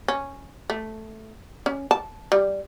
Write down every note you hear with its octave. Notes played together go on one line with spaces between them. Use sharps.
C#4
A3
C#4
A5
G3